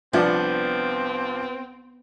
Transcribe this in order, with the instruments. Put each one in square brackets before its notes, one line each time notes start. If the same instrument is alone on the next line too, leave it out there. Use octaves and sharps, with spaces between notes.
[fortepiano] C2 F3 D4 [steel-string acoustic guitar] B3 [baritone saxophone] C4